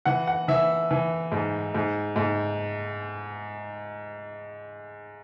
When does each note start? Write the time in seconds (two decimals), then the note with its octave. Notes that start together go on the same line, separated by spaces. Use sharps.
0.06 E3 F#5
0.27 F#5
0.48 E3 E5
0.91 E3
1.32 G#2
1.75 G#2
2.16 G#2